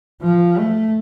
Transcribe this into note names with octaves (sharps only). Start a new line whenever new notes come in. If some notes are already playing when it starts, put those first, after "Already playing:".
F3
A3